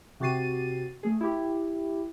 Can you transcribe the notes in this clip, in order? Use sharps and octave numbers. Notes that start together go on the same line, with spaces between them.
C3 F#4 G4 A6 C7 D#7
A3 G#4
E4 G4